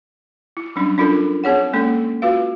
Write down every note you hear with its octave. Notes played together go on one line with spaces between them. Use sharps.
E4
F#3 G3 C#4 D4
C#4 D4 F4 A4 A#4
C4 G#4 C#5 F#5
G#3 A#3 C#4 A4
F4 F#4 B4 F5